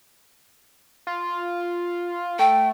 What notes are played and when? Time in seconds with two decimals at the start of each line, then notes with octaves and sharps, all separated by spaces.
1.07 F4
2.39 A3 G5